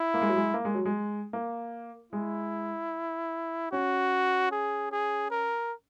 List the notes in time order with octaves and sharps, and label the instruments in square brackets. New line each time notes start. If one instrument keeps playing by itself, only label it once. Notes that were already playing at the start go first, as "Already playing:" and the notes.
Already playing: [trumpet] E4
[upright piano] A#3
G#3
F#3
G#3
A#3
G#3
F#3
G#3
A#3
[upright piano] G#3 [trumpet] E4
[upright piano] C#4 [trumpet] F#4
[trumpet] G#4
G#4
A#4